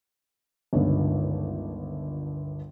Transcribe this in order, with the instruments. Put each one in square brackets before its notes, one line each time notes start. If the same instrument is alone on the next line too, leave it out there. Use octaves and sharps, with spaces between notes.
[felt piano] G1 C#2 D3 D#3